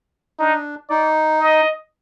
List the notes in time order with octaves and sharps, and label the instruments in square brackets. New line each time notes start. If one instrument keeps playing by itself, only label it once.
[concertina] D4 [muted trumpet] D#4
[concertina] D#4 [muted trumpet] D5
[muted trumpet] D#5